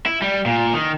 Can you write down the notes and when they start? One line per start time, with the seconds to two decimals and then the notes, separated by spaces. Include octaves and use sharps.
0.06 E4
0.22 G3
0.46 A#2
0.73 D#3